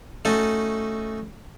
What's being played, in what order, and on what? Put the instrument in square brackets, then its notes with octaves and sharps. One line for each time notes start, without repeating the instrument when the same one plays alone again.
[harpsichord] A3 C#4 D#4 F#4 A4